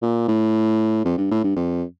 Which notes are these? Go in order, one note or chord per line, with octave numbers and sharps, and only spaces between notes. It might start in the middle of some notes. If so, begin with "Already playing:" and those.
A#2
A2
F2
G2
A2
G2
F2